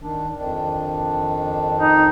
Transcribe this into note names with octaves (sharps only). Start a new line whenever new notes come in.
D#3 D4
F2 D#3 D4
D#4